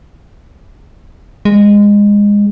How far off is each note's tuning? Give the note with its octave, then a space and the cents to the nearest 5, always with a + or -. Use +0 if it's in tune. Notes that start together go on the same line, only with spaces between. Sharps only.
G#3 -20